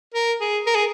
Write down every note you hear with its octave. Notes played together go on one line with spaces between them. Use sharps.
A#4
G#4
A#4
G#4